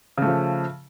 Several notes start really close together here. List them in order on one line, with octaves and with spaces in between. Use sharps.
C#3 A3 F3